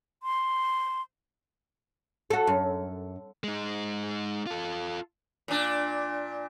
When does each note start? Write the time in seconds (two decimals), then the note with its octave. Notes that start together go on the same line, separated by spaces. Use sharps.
0.23 C6
2.30 F#4 A4
2.47 F#2
3.44 G#3 D#4
4.46 F4 A4
5.48 A#2 D4